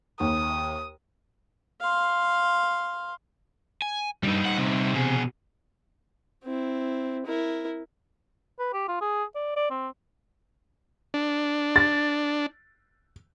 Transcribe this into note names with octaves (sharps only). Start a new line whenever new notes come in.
D#2 D#6
F5 C6
G#5
D2 G2 G3 D#4
F#5
C3
B2 G#4
C4 E4
E4 A#4
B4
G4
F4
G#4
D5
D5
C4
D4
A6